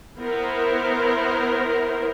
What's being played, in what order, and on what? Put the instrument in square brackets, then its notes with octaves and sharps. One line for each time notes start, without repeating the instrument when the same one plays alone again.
[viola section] B3 E4 A#4 C5